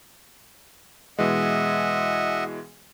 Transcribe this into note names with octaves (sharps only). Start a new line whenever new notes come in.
B2 E3 G#3 D#5 E5 F#5